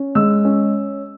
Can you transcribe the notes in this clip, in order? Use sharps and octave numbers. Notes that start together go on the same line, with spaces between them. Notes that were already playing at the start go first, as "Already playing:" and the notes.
Already playing: C#4
G#3 E6
C#4